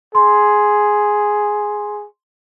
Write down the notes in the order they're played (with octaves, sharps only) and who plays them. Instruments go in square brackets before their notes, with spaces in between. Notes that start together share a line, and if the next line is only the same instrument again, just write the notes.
[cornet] G#4 [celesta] C6